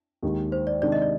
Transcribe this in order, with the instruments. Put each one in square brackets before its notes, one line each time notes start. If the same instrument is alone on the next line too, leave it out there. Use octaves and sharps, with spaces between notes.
[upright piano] D#2 D#3 G#3
[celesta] C5
D5
[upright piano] C3 D#3 G#3 D4 [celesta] D5
[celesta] D#5
D5